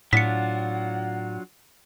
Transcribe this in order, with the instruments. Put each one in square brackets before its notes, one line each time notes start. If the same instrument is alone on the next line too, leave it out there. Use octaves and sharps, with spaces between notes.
[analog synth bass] A2 [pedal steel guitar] F#3 D4 F4 [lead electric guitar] F#5 [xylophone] B6 C#7